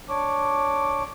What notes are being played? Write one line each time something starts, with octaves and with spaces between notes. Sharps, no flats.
D4 C#5 D6